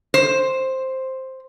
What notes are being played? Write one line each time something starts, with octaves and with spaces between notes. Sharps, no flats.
C5